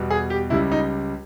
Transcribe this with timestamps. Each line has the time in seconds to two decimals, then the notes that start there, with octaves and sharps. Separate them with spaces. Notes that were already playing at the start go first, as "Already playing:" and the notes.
Already playing: E2 B2 G3
0.11 G#4
0.30 G4
0.50 C#2 C#3 G3 E4
0.72 D#4